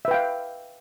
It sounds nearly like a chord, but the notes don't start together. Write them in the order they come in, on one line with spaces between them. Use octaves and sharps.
E5 B4 G5 F5